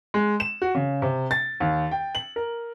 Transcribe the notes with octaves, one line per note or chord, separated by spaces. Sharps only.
G#3
E7
F#4
C#3
C3
A6
D#2
G5
F#7
A#4